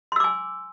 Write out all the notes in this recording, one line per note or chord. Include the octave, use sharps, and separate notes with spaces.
G#5 C6 D6 E6